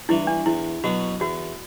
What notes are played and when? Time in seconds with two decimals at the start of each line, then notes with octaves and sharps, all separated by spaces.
0.09 G2 E3 E4
0.27 D4
0.46 E2 E4
0.84 B2 F#3 B3 F#4
1.20 E2 F#4